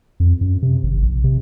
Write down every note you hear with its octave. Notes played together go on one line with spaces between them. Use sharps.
F2
F#2
C3
G#1
A#1
C3